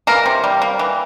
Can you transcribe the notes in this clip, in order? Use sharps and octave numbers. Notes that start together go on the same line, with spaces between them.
E3 A#3 A#4
C3
G3
A#3
E3